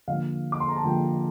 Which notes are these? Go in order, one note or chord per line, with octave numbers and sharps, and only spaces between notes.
D3 F3 A#3 F5
D6
C6
A#5
A5
D3 F3 A#3 G5